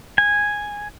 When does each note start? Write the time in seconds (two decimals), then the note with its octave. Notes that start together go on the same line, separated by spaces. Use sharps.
0.18 G#5